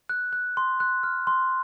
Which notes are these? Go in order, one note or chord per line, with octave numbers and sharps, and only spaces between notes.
F#6
F#6
C6
F#6
F6
C6